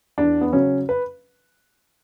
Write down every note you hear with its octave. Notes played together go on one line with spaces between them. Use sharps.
E2 D4
B3
C#3 F#3 C#4
B4